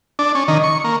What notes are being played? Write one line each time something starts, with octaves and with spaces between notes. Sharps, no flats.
D4
C#4
D#3
C#6
A#3